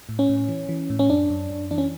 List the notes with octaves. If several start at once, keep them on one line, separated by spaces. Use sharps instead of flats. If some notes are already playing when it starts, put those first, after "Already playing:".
A2
C#4
A2
E3
E3
A2
C#4
F#2 D4
F#2
F#2
E3 D4
C#4